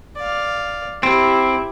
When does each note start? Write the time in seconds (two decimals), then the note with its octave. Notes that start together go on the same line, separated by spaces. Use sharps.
0.16 D5 F5
1.03 C4 E4 G4